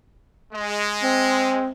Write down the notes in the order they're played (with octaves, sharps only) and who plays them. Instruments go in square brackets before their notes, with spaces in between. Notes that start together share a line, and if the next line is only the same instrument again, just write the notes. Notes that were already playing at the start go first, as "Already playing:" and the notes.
[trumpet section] G#3
[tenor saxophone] C4